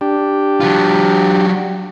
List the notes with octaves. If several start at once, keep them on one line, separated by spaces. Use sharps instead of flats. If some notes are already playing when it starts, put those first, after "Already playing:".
D4 G4
F#3 F4